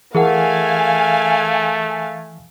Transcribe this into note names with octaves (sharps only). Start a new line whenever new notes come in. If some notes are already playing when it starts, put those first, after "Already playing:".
E3 A3 G#4 A#4 F5 F#5 G#5